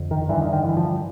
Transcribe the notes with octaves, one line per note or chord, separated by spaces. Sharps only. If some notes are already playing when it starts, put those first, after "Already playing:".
Already playing: F2 D3
D#3
G2 D3 E3
D#3
D#3
E3
F3